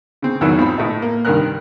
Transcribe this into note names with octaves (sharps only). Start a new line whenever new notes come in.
C#3 C4
E2 G#2 D#3 F#3 E4 E6
G#1 C4 F4 B5
A2 D#4
A#3
C2 G2 D#3 A#4 F#6